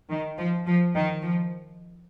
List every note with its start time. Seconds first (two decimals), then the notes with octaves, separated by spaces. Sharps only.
0.09 D#3
0.37 F3
0.66 F3
0.96 D#3
1.23 F3